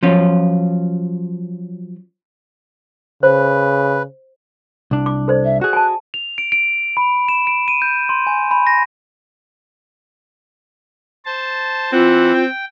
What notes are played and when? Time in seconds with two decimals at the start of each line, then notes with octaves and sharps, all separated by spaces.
0.03 F3 F#3 C#4 F4
3.23 C#3 B4 C5
4.91 C2 D4
5.06 D6
5.28 A4 C5 D5
5.45 E5
5.61 F#4 G#4 F#6
5.73 G#5 A5
6.14 F7
6.38 D7
6.52 D7
6.97 B5
7.28 E7
7.47 D7
7.68 D#7
7.82 G6
8.09 C6
8.27 G#5
8.51 B5
8.67 A#6
11.26 C5 A5
11.93 E3 C4 F4 F#5
12.34 G5